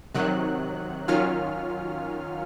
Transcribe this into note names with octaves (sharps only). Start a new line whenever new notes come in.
C3 D#3 F#3 F#6
D#3 F#3 C#4 F4 F6